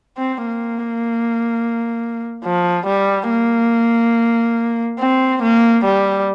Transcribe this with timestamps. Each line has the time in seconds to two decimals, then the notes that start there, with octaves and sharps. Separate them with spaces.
0.18 C4
0.47 A#3
2.45 F3
2.86 G3
3.30 A#3
4.99 C4
5.42 A#3
5.84 G3